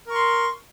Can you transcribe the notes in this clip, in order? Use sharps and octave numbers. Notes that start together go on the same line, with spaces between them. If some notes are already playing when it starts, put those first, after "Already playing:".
A#4 C6 C#6